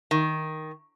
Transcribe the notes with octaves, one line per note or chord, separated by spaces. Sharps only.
D#3